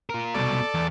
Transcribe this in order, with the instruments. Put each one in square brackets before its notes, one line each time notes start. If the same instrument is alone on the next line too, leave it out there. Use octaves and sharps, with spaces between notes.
[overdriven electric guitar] F4 A#4
[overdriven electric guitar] C2 B2 [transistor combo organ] A4 D5
[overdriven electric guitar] E2